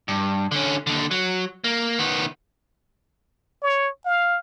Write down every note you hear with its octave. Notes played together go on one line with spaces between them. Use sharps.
G2
D3 C#4
D#2 D3
F#3
A#3
D#3 B3
C#5
F5